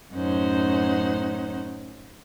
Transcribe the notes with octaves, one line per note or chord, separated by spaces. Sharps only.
F#2 A2 C#4 D#4 C5 F#5